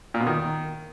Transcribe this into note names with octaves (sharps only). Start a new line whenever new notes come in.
A#2
B2
D#3